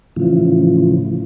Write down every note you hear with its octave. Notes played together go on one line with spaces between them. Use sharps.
A2 C#3 E3 F3